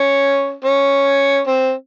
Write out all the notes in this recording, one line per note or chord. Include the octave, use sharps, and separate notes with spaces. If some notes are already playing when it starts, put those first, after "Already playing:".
Already playing: C#4
C#4
C4